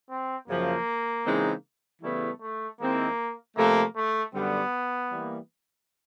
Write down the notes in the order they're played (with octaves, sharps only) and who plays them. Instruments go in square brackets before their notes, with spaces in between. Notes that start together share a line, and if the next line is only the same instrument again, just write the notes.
[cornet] C4
[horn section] F#2 C#3 F3 [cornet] A#3
[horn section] C#3 E3 G#3 C4 D#4
[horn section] C#3 E3 G3 B3 E4 [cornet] A3
[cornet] A3
[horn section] D#3 G#3 C4 E4 [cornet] A#3
[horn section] C3 F3 A3 [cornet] A#3
[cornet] A3
[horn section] F#2 D3 G3 [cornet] B3
[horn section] E3 G3 A#3